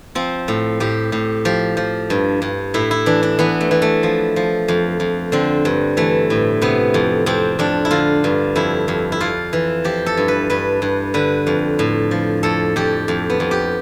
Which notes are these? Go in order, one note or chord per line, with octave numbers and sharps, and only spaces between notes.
F3 C4
A2
A2 G4
A2
F3 G4
F3
G2
G2
A2 E4
E4
E3 D4
D4
E3 B3
A3
E3
A3
F3
F3
F2
F2
D3 C4
G2
E3 A3
A2
C3 B3
F2
F2 C4
F2 D4
E4
D3 F4
G2
F2 E4
F2
E4
F2 F4
E3
F3 G4
A4
G2
B4
G2 B4
G2
D3 B4
F2
A2
F3
F2 A4
F2 G4
F2
B3
F2
G4